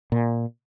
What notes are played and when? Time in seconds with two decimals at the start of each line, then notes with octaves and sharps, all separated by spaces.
0.12 A#2